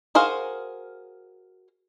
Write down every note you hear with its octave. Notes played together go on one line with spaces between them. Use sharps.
F#4 G#4 A#4 C5 F5